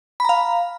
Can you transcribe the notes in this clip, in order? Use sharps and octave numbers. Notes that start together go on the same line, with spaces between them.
F5 A#5 B5